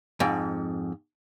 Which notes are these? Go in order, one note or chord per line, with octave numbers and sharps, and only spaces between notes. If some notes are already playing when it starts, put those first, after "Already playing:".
F2 G#2